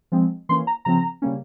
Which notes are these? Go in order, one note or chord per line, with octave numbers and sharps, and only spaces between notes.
F3 G#3 C4
E3 A#3 C#4 C6
A#5
C#3 F3 C4 A#5
C#3 G3 A#3 C#4